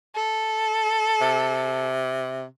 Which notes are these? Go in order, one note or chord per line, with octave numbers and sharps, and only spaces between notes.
A4
C3